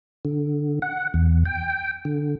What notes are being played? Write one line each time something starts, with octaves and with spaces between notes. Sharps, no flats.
D3
F#5
E2
G5
D3